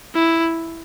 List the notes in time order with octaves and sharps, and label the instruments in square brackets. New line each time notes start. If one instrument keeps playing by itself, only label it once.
[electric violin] E4